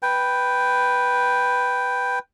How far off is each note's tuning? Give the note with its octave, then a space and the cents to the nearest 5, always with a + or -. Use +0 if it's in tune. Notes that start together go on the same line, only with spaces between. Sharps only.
B4 +0 G5 +0